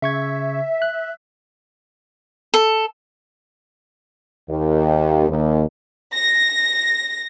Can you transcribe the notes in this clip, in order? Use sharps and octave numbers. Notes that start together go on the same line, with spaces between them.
C#3 E5 C#6 G#6
F#6
A4
D#2
D#2
A#6